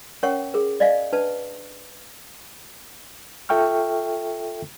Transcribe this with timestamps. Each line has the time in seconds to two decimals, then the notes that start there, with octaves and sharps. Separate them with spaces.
0.23 C#4 A#4 C#5 F#5 G5 C#6
0.54 G#4 A#4
0.80 D5 D#5 F5 G#5
1.12 D4 B4 A5
3.49 F4 A4 E5 G5 C#6 F6